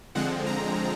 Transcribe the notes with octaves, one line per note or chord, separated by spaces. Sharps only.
D3 F3 G#3 C4 F#5
A#5